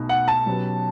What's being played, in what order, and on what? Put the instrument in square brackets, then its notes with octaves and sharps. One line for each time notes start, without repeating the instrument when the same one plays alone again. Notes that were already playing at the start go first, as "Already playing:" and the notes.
Already playing: [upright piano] B1 B2 A3
[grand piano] F#5
A5
[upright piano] B2 F#3 C#4 G4 B4